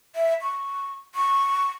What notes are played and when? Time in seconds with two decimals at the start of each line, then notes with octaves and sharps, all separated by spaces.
0.16 E5
0.42 C#6
1.15 C#6